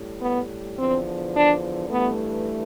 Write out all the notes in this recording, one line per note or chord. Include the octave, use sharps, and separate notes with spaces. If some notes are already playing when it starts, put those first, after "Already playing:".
Already playing: A2 G3
B3
E2 D3 F3 C4
D4
G2 E3 A3 B3